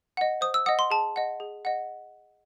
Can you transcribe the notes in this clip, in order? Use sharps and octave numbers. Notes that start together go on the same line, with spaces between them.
D#5 F#5
C5 D#6
E6
D#5 F#5 D#6
C6
G#4 A5
D#5 F#5
G#4
D#5 F#5